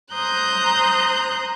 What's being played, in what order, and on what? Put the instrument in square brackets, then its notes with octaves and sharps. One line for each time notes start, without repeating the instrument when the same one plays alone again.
[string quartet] C5 A#5 D#6 F#6 G6